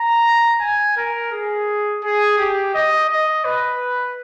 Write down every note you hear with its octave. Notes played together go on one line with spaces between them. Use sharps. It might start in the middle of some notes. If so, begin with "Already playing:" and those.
Already playing: A#5
G#5
A#4
G#4
G#4
G4
D#5
D#5
B4